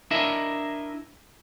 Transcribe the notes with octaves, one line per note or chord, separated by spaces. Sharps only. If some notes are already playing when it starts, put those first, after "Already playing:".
D4 E4 A#4 D#5 E5